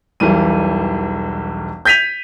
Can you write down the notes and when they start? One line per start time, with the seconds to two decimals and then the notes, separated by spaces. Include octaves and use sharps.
0.20 E1 B1 E3 G3 D#7
1.85 G6 G#6 B6 D#7 F7